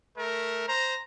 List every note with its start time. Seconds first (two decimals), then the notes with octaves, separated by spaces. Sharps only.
0.16 A3 A#4
0.67 C5 A#5